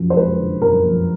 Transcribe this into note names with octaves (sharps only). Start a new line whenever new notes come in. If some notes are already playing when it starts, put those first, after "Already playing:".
Already playing: F#2 F3
C5
G#3 B4
D3
F#2 A#4
F3